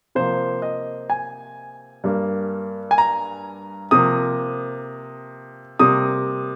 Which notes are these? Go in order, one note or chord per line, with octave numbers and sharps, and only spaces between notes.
C3 F3 A#3 C5
D#5
G#5
G2 G3 A#3
G#5
A#5
C3 F3 A#3 D#6
C3 G3 A#3 D#6